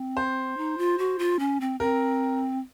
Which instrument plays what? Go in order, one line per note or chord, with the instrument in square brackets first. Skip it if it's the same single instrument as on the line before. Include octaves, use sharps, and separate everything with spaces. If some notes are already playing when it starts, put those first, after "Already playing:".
Already playing: [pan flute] C4
[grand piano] C5
[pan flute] D#4
F4
F#4
F4
C#4
C4
[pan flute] C4 [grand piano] A#4